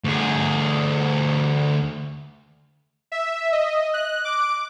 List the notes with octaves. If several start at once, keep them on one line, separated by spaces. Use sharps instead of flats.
D2 G#4
E5
D#5
F#6
D6